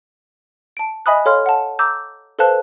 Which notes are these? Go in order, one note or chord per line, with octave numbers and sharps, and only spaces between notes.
A5 D7
D#5 E5 G#5 B5 D#6 F#6
A4 C#5 F5 C6 F6
F#5 A5
A#5 D6 E6 G6
A4 B4 C5 F5 A5 F#6